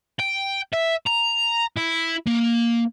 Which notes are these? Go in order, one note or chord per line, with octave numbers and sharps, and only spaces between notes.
G5
E5
A#5
E4
A#3